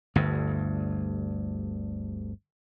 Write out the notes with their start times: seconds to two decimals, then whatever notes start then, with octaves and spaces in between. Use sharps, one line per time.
0.15 G1 D2 G2